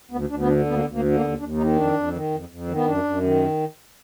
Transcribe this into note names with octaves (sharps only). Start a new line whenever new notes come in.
D2 B3
D2 D4
B3
D3 D4
D2 B3
A#3
B3
D2
A#3
D3
A#3
D#2 B3
D#2 D4
D#3 D#4
F2 D4
F2
D#3
F2
F2
D#3
B3
F#2 D4
F#2
D#3